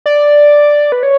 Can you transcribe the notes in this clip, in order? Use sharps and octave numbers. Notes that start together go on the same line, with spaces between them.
D5
B4
C#5